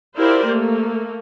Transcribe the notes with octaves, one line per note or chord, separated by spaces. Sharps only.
E4 F4 G4 A#4 C5 D5
A3 A#3